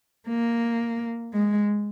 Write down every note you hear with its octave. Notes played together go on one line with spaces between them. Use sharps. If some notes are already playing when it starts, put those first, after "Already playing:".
A#3
G#3